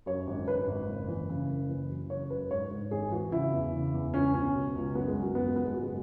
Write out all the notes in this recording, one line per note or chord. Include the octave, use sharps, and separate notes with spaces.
F#2 C#5
G#1
G#1 B4
G#1
F#1
E3
C#3
F#1
E3
F#2
C#3 C#5
F#2 B4
G#2 C#5
G#2
G#1 G#4
E3 F#4
C#3 E4
E2
C#3
E2
C#2 C#4
B2 C#4
B2
C#2
F#2 B3
G#3
F#2
F#3
G#1 B3
G#1 B3
G#3
F#1 F#3
G#3